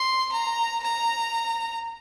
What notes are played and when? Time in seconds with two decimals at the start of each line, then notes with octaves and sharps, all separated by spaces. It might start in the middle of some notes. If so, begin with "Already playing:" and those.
Already playing: C6
0.32 A#5
0.83 A#5